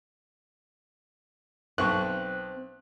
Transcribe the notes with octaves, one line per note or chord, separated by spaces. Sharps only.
B1 C4 C#6 F#6